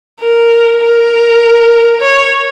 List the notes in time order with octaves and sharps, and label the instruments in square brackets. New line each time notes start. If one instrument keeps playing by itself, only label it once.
[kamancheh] A#4
A#4
C#5